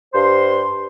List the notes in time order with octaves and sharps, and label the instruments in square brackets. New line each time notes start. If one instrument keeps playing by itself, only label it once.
[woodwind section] G2 C5 C6